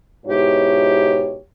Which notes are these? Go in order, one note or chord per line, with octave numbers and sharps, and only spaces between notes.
G#2 B2 E4 G4 C#5